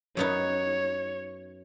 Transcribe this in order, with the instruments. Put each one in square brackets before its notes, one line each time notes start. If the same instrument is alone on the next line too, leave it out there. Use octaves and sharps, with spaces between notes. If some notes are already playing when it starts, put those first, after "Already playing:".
[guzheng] F#2 B3 D#4 [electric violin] C#5